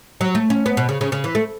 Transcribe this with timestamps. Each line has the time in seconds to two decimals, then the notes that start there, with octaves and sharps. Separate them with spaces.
0.21 F#3
0.35 A3
0.50 C#4
0.66 B3
0.77 B2
0.89 C#3
1.01 C#3
1.12 C#3
1.24 E3
1.35 A3